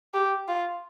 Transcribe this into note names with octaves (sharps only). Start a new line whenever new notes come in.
G4
F4